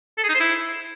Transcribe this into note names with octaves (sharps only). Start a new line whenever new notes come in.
A4
G#4
D#4
C5
E4